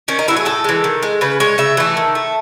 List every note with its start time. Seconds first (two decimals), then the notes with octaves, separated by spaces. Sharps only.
0.08 D#3 C#4
0.19 D#4
0.28 F#3 A3 E4
0.37 G#4
0.45 A2 A4
0.64 E3 G#3
0.84 D#3
1.02 G#3
1.21 C#3 B4
1.40 G#3 C#5
1.58 C#3 E5
1.77 E3 A3
1.97 D#3
2.15 A3